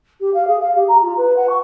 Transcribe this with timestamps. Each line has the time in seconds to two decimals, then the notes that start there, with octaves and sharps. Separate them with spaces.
0.20 G4
0.34 F5
0.47 G#4
0.60 F5
0.75 G4
0.88 A#5
1.02 F4
1.17 B4
1.36 F#5
1.49 C#6